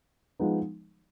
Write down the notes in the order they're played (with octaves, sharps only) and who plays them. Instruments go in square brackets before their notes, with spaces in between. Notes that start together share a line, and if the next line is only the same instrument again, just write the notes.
[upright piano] F3 G#3 B3 D#4